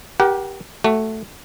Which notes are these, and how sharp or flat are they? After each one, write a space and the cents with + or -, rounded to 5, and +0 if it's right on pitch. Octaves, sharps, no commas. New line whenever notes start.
G4 +0 A#4 +35 F#5 +30
A3 +0 F#4 +25